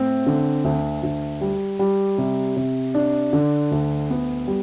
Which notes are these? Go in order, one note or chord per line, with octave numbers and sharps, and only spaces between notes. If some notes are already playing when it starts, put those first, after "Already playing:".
Already playing: A2 C4
D3
D2
D2
G3
G3
C3
C3
D4
D3
D2
B3
G3